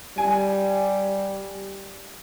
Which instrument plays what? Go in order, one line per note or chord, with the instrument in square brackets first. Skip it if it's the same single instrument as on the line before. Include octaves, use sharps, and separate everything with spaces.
[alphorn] G3 [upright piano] G#5